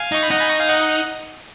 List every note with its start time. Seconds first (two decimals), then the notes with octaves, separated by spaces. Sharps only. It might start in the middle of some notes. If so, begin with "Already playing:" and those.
Already playing: F5 G#5
0.12 D#4 C#6
0.23 B5
0.30 D#4 F#5 A#5
0.41 G#5 B5
0.49 A#5 C#6
0.59 F5 G#5
0.69 D#5 F#5